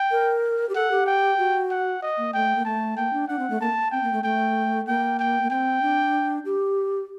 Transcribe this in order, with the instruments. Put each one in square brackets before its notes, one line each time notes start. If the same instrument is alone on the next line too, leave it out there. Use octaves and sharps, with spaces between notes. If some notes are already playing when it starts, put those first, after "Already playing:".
Already playing: [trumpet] G5
[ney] A#4
G4
[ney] A4 [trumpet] F#5
[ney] G4
[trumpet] G5
[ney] F#4
[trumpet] F#5
D#5
[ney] A#3
[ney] A3 [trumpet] G5
[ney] A#3
[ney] A3 [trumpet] A5
[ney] A#3 [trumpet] G5
[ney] D4
[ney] D4 [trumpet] F#5
[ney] C4
A3
[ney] A#3 [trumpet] A5
[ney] C4 [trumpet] G5
[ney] A#3
A3
[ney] A3 [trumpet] G5
[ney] A#3 [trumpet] G5
[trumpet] G5
[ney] A#3
[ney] C4 [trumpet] G5
[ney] D4
G4